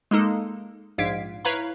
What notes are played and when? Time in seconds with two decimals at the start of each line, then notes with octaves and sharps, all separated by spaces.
0.11 G#3 A#3 D#4 A4
0.98 A#1 G#2 F5 G#6 B6 D7
1.45 E4 B4 C#5 F5 A#5 B5